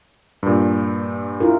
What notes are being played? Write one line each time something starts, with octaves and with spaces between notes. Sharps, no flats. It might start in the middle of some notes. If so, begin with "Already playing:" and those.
G2 A#2
E4 F4 A#4